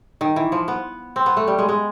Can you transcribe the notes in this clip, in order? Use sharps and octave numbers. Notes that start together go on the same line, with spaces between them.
D#3
E3
F3
B3
C4
B3
A3
G3
G#3
G#3